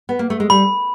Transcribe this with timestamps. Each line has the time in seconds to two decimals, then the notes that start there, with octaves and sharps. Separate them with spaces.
0.09 B3
0.19 A#3
0.30 A3
0.40 G#3
0.50 G3 B5